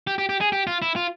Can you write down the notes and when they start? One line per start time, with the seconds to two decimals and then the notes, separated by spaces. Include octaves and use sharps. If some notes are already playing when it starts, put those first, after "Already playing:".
0.07 G4
0.18 G4
0.29 G4
0.41 G#4
0.52 G4
0.67 F4
0.82 E4
0.96 F4